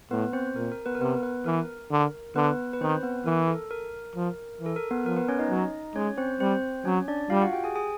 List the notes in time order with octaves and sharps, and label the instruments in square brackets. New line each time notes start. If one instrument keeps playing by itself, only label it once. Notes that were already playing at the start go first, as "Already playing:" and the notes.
[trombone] A2 [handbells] B3 B4
[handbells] C4 C5
[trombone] A#2 [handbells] A#4
[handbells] A#4
B3 B4
A#4
[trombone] C3 [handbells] B3 B4
[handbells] B3 B4
[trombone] E3 [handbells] A#4
[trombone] D3
[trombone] D3 [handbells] B3 B4
[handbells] B4
[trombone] D#3 [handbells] C4 C5
[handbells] B3 B4
[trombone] E3 [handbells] A#4
[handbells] A4
A#4
[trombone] F3
E3
[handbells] A4
A#4
B3 B4
[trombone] F3 [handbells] A#4
[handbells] B3 B4
C#4 C#5
D#4 D#5
[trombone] F#3
[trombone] G#3 [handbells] C#4 C#5
[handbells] C4 C5
[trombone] G3 [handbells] C4 C5
[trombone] F#3 [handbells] C#4 C#5
[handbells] D4 D5
[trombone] G3 [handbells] F4 F5
[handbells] F#4 F#5
G4 G5
G#4 G#5
G#4 G#5